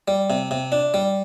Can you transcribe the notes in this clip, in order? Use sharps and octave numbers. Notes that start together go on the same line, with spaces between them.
G3
C3
C3
D4
G3